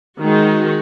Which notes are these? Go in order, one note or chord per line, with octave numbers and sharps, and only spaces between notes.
D#3 G#3 D#4 F#4